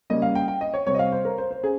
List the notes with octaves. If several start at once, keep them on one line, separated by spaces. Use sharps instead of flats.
C#3 G3 A#3 C#4 D#5
F5
G5
G5
D#5
C#5
C3 G3 C4 C#5
D#5
F5
C5
A#4
C5
C5
C#4 G#4